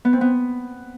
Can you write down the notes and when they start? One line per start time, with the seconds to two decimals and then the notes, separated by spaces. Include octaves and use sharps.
0.05 B3
0.13 C4
0.21 B3